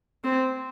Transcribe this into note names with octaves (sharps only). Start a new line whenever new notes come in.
C4